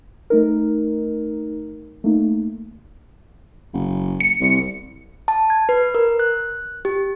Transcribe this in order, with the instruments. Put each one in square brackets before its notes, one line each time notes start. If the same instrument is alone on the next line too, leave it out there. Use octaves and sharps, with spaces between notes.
[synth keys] A3 D#4 A#4
A3 A#3 D#4
[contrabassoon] F#1
[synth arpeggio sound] C#7
[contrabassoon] C2
[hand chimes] A5
G#6
B4
A#4
F#6
G4